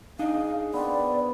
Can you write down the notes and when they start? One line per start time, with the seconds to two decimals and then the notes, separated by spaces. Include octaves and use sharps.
0.19 D4 D#4 G#4 D#5 F5
0.73 B3 C4 D5